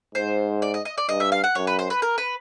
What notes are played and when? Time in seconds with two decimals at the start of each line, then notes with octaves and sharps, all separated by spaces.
0.15 G#2 C5
0.62 D5
0.74 D#5
0.85 D#5
0.98 D5
1.09 G2 D#5
1.20 E5
1.32 F5
1.44 F#5
1.55 F#2 C#5
1.67 B4
1.79 C5
1.90 B4
2.02 A#4
2.18 B4